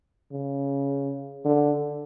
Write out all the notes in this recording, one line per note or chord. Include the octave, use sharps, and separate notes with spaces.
C#3
D3